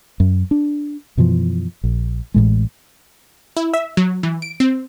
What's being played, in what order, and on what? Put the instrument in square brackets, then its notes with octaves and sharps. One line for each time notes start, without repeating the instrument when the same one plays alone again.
[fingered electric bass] F#2
D4
F#2 B2 E3 F3
A#1
A1 A2 G#3
[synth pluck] E4
E5
F#3
E3
D7
C4